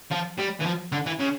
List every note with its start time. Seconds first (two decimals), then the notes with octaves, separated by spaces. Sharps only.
0.11 F3
0.38 G3
0.60 E3
0.65 F3
0.92 D3
1.06 E3
1.20 C#3